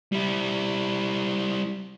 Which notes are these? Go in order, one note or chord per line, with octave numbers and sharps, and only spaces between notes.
G3 E4